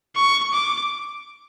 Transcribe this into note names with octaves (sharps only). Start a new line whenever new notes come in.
C#6
D6